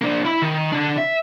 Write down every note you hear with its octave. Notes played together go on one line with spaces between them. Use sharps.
A#3 D4
E4 B5
D#3
D3 D4
E5